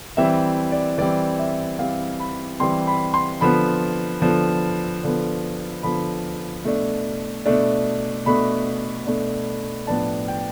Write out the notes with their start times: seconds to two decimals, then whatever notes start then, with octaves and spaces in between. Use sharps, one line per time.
0.17 E3 G3 C4 E5
0.72 D5
0.98 E3 G3 C4 D5
1.39 E5
1.79 E3 G3 C4 F5
2.20 B5
2.60 E3 G3 C4 C6
2.87 B5
3.14 C6
3.41 D3 F3 B3 B5
4.22 D3 F3 B3
5.03 D3 F3 B3
5.83 D3 F3 B3 B5
6.65 B2 A3 D4
7.46 B2 A3 D4
8.26 B2 A3 D4 B5
9.07 B2 A3 D4
9.87 A2 F3 B3 D4 A5
10.28 G5